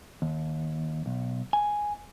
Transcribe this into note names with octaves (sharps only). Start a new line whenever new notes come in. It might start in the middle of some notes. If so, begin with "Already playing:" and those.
D#2
B1
G#5